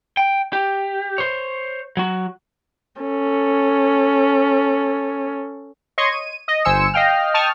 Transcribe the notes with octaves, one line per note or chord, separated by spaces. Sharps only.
G5
G4
C5 C#5
F#3 F#4
C#4 A4
C#5 D#5 C6 C#6 G#6
D#7
D#5
G1 C5 G#5 E6 C#7 E7
D#5 F5 G5 F6
G5 A5 C#6 D#6 F6